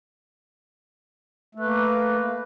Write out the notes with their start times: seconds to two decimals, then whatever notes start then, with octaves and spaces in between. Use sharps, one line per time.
1.55 A3
1.60 B4
1.65 A#3